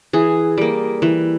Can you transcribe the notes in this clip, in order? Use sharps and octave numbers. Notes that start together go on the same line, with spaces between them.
E3 G#4
G3 A#3
E3